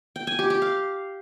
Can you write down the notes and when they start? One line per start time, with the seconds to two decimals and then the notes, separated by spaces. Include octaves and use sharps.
0.16 G5
0.27 G#5
0.39 G4
0.50 G4
0.62 F5